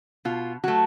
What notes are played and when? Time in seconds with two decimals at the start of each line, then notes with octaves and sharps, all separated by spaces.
0.25 B2 F4
0.64 F#3 A3 F#4